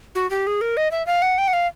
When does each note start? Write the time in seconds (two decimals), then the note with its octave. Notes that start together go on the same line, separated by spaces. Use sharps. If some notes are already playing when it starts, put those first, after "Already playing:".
0.15 F#4
0.30 G4
0.47 G#4
0.61 A#4
0.77 D#5
0.91 E5
1.07 F5
1.22 F#5
1.38 G5
1.48 F#5
1.53 F5